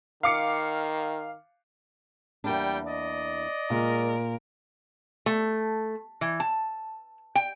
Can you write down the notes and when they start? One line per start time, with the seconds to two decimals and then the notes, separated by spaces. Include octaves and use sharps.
0.23 D#3 F5 D6 C#7
2.44 E2 G3 A#3 D4 G5
2.87 D5 D#5
3.70 A#2 G#3 A#4
5.26 A3
6.21 E3
6.40 A5
7.35 G5